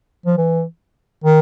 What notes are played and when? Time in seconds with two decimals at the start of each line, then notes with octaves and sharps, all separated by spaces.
0.26 F3
0.38 E3
1.25 D#3